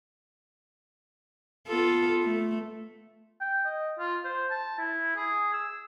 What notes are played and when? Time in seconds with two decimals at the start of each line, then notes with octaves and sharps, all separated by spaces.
1.68 B3 F4 A4
2.23 A3
3.41 G5
3.65 D#5
3.99 F4
4.25 C5
4.51 A5
4.78 E4
5.16 G#4
5.53 E6